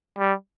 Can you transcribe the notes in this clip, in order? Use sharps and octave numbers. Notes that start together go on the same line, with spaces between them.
G3